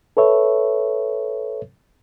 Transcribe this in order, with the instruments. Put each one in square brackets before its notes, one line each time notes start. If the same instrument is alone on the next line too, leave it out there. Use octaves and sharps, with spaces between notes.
[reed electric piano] A4 B4 C#5 E5